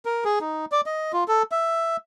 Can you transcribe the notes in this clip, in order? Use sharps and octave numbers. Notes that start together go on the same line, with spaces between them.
A#4
G#4
D#4
D5
D#5
F4
A4
E5